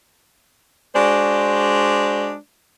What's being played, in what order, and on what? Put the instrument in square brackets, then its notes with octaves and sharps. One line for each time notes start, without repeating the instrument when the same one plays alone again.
[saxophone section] G#3 D4 F#4 C5 D5